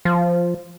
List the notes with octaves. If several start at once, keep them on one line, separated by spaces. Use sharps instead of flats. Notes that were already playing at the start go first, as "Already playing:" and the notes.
F3